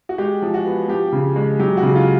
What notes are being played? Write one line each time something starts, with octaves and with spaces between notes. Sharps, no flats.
F#4
G#3 G4
F3
F#4
B3
F3 G4
C#3
G#3
F#3 G4
F#4
C#3
F4